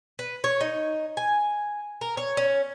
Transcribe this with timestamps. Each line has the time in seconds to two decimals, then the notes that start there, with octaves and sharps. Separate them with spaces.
0.19 B4
0.44 C#5
0.61 D#4
1.17 G#5
2.01 A#4
2.17 C#5
2.37 C#4